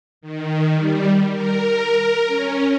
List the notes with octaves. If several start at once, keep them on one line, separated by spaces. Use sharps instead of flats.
D#3
G3
A#4
C#4